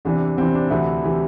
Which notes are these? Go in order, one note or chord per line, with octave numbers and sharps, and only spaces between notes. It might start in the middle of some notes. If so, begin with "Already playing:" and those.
E2 C3 E3 D4
E2 C3 E3 C4
D4
D2 C3 E3 E4
C3 E3